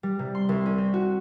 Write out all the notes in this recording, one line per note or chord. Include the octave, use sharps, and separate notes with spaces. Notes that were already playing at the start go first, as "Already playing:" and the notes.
G3
C3
C6
C2
C#4
C4
F#4